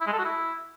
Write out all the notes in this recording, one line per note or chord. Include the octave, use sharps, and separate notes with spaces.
E4
G#3
A4
F#4
E4